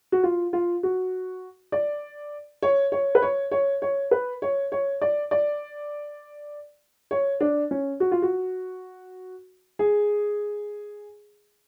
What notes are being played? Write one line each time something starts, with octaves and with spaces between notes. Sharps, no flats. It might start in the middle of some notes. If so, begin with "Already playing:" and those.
F#4
F4
F4
F#4
D5
C#5
C#5
B4
C#5
C#5
C#5
B4
C#5
C#5
D5
D5
C#5
D4
C#4
F#4
F4
F#4
G#4